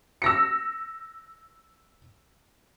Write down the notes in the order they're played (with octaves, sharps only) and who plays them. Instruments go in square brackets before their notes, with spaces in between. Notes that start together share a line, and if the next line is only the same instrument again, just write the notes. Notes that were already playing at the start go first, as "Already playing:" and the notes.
[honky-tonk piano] E6 A#6 C#7